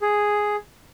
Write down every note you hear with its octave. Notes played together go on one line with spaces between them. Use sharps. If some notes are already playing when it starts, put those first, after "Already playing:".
G#4